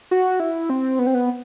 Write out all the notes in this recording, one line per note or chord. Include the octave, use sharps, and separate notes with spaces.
F#4
E4
C4
B3
C4
B3